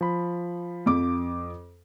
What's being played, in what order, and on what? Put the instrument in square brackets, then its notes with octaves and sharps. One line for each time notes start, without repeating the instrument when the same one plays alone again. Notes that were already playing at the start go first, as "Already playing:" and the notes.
[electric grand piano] F3 B5
[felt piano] F2 D6